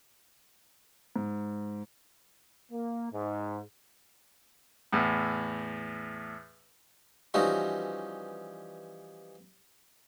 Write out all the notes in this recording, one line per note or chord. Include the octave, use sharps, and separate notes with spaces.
G#2
A#3
G#2
E2 A2
E3 F3 G3 C#4 D#4 F#4